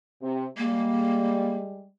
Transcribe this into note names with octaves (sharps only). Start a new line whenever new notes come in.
C3
G3 G#3 A#3